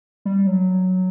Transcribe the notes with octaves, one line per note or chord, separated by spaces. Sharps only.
G3
F#3